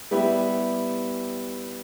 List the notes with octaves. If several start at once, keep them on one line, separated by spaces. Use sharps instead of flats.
G3 B3 E4 G4